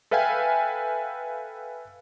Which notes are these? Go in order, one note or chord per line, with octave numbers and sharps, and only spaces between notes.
A4 B4 E5 F5 G5 G#5